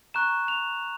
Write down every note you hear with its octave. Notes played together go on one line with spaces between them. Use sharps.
A#5 C#6 F#6 E7
F7